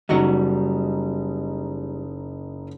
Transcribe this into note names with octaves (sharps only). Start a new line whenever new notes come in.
F#1 G3 D#4 F#4 A#5